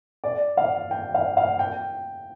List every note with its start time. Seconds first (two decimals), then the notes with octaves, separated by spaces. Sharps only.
0.24 D5
0.57 F5
0.91 G5
1.14 F5
1.37 F5
1.59 G5